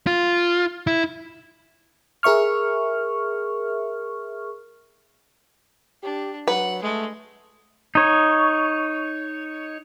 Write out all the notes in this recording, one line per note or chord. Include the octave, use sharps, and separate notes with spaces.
F4
E4
G#4 A#4 E5 C#6 F6
D4 G4
F#3 B4 F#5
G#3 A3
D#4 C#5